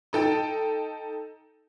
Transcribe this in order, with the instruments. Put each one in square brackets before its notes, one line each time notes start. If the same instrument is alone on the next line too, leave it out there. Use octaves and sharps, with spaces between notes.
[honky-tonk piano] D#4 A4 G5 A5